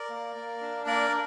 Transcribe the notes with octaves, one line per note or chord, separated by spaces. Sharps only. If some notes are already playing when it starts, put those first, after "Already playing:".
Already playing: A#4 D5
A#3
A#3
D4
A#3 A#4 D5